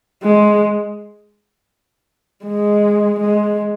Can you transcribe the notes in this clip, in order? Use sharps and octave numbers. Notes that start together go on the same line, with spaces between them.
G#3
G#3
G#3